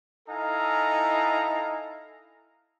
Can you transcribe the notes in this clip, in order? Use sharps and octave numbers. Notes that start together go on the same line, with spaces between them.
D#4 E4 A4 F5 G#5 A#5